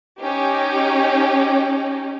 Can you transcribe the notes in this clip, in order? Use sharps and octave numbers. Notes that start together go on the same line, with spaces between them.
C#4 D#4 G4